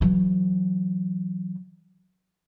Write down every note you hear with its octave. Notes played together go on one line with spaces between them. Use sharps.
E3 F#3